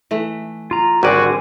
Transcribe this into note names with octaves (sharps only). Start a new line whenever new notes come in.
E3 A3
F4 A#5
G#1 D3 G3 C4 F#4 D5 G#5 D6